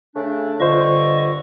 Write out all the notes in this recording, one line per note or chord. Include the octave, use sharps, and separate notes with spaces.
C#3 A3 D4
G2 D3 F4 C5 D#5 C#6